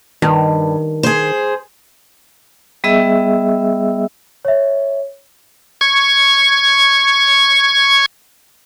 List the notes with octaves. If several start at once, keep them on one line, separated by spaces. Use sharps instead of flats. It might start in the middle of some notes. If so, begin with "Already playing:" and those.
G2 D#3
G#4 C5
G3 B3 G#4 D#5 E5 E6
C#5 E5
C#6 G#6